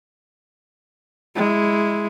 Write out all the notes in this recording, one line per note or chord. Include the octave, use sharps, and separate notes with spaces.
G#3 E4